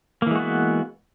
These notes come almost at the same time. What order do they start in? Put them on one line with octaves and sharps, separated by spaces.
A#3 E3 G#3 F#4 B3